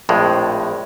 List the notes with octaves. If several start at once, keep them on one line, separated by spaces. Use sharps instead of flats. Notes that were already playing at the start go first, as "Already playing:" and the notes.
A#1 F2 A2 G#3